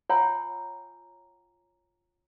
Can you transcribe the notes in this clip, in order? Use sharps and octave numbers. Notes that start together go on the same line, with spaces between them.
F4 C#5 F#5 G#5 A#5 E6